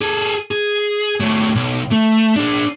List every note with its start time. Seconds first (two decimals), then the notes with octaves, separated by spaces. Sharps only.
0.01 G#4 A4
0.51 G#4
1.20 F#3 A3
1.55 B1
1.91 A3
2.36 D4 G#4